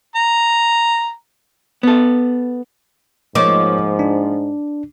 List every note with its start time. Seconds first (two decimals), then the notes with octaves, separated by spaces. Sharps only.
0.16 A#5
1.83 B3 A4
3.35 G#2 F3 A#3 C#5 D#5 D6
3.99 D4